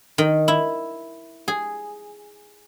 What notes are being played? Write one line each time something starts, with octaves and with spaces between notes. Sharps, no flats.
D#3
E4
G#4